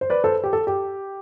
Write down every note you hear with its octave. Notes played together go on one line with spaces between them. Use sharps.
C5
B4 D5
A4 C5
G4
A4
G4